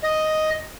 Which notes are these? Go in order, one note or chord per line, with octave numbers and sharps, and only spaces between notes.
D#5